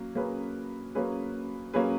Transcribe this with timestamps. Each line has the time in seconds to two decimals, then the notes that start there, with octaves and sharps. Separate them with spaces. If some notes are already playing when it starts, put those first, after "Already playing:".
Already playing: F#3 A#3 C#4
0.15 F#3 A#3 C#4 G#4 B4
0.95 F#3 A#3 C#4 G#4 B4
1.74 F#3 A#3 C#4 G#4 B4